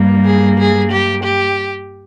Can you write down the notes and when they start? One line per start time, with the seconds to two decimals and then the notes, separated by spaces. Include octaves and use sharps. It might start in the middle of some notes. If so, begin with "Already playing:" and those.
Already playing: G2 G3 A#3
0.26 G#4
0.58 G#4
0.92 G4
1.23 G4